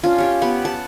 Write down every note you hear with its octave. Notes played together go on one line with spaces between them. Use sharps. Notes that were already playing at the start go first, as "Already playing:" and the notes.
C#4 D4 F4
G4 C#5
B3 G4 F#5 G#5
F#5 A5